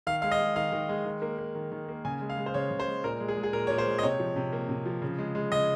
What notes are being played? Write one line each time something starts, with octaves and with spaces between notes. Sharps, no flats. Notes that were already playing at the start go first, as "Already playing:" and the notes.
D#3 F5
G#3 F5
D#5
G#3
D#3 F5
D#3
G#3
D#3
A#3
A#3
D#3
D#3
A#3
C#3 G#5
G#3
F5
G#3
C5
C#3 C#5
C#3
C5
G#3
A#2 A#4
G#3
G#4
G#3
G#4
A#2 A#4
A#2 C#5
C5
G#3
D#5
C3 C#5
F3
C3
A#3
C3
F3
C#3
G#3
G#3
C#3 D#5